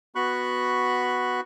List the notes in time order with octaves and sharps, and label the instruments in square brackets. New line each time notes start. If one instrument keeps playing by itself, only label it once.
[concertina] B3 F#4 B5 C#6 F#6